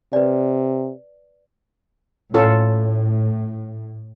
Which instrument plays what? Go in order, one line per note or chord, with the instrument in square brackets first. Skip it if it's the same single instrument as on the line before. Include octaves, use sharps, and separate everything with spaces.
[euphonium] C3 [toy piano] B4 D5
[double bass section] A2 [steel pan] C#4 F4 A4